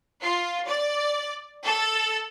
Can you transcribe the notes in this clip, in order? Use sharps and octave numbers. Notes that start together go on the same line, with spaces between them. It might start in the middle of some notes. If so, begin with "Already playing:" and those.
F4
D5
A4